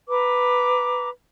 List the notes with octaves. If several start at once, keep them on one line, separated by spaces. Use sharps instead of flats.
B4 A#5 D6